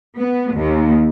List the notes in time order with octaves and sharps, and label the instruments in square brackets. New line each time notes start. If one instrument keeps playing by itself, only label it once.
[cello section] B3
D#2